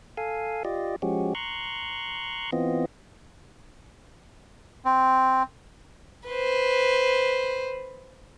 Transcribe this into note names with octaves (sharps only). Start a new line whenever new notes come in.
A4 F5 G#5
F4 G4 D5 D#5
F3 G#3 C#4 F#4 G4
A#5 C6 C#6 F#6
E3 B3 C4 F4 D#5
C4
B4 C5